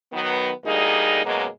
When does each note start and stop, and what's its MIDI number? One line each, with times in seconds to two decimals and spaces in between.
0.13 0.51 51
0.13 0.51 54
0.13 0.51 59
0.65 1.23 38
0.65 1.23 55
0.65 1.23 58
0.65 1.23 63
0.65 1.23 68
1.25 1.46 42
1.25 1.46 47
1.25 1.46 54
1.25 1.46 56
1.25 1.46 58